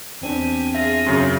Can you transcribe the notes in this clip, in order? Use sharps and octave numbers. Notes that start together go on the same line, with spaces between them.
E2 C4 D4 G4 G#5
F4 G#4 E5 A#6
F#2 C#3